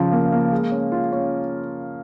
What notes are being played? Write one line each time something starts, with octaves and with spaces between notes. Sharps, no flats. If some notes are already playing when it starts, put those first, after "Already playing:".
Already playing: C#3 F3
A#3
A#3
G#3
C#4
F4
C#4